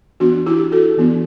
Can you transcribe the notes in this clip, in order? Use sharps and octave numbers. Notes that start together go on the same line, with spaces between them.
E3 B3 D4 F#4
E4 G4
F#4 A4
E3 B3 D4